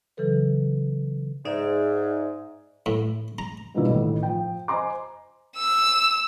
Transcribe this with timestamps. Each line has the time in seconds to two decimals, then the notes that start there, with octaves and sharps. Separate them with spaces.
0.17 C#3 E3 F#3 A4 B4
1.45 G#2 D#4 D5 E5
2.86 A2
3.39 A#5
3.74 G#2 B2 D3 G3 A#3 E4
3.88 A1 A2 D#3
4.23 F3 G5
4.68 C5 D#5 G#5 A#5 C6 D6
5.57 E6